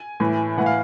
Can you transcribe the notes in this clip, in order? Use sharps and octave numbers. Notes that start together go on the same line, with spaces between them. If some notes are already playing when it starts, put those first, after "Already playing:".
Already playing: G#5
A2 E3
A2 E3 F#5
F5